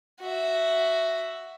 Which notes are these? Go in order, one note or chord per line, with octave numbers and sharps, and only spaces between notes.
F#4 E5